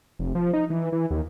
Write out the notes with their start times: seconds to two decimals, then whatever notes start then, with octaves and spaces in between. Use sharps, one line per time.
0.19 F1
0.35 F3
0.53 D#4
0.70 E3
0.92 E3
1.10 D#2